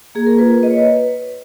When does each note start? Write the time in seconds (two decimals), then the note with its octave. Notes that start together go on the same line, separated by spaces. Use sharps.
0.15 A#3 G#4
0.27 A#4
0.38 F4 B4
0.61 A#3 D#5
0.70 C#5
0.77 B4